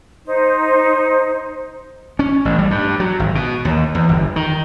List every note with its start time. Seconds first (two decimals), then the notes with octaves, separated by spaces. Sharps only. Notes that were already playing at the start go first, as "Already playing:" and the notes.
0.25 D#4 C5
2.19 C#4
2.45 A1
2.59 G3
2.71 G2
3.00 F#3
3.20 G#1
3.35 B2
3.65 D#2
3.95 E2
4.09 G1
4.36 D#3